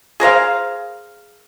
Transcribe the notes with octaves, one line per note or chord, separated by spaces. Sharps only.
G#4 A#4 C5 F5